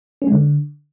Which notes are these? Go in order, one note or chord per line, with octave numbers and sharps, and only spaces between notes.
C#4
G#3
D3